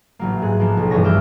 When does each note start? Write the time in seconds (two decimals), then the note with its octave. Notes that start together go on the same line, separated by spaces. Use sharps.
0.19 A1 F#3 A#3
0.42 G#2 G#4 F#6
0.58 F3 A#3 B3
0.77 B1
0.91 G2 E3 B3 C#5 A#6
1.04 D6 E6 F6 G6